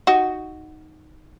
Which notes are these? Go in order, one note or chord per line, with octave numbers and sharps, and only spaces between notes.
D#4 F#4